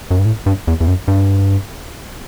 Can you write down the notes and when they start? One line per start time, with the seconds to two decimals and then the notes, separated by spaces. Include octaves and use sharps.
0.11 F#2
0.19 G2
0.25 A2
0.46 G2
0.67 E2
0.80 E2
0.88 F#2
1.08 G2